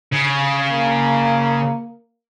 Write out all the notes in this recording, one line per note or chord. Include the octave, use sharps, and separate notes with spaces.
C#3
A#3